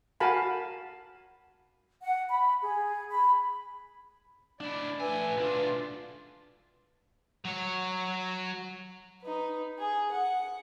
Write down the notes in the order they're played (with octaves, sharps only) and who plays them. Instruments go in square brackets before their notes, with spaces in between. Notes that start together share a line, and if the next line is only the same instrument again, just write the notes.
[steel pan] F#4 A#4 F5 G#5 A5 B5
[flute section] F#5
B5
G#4
B5
[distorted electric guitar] D4 E4 [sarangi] D5
[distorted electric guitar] A3 G#5 [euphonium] B4 [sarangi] E5
[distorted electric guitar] B1 D4 [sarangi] F4
[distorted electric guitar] F#3 C#5
[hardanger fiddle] D#4 B4
G#4
F#5